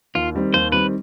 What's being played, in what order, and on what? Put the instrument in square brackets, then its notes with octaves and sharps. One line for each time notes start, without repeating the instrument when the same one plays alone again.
[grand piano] D#2 [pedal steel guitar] F4
[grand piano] D#3 G3 C4
[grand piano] D#2 [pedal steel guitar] C5
[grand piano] D#3 G3 C4 [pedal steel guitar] B4